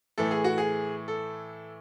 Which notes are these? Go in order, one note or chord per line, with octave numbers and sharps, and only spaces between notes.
A2 E3 A3 A4
G#4
F#4
G#4
A4